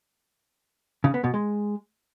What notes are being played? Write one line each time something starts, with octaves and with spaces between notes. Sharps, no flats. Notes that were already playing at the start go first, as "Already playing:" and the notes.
C#3
B3
B2
G#3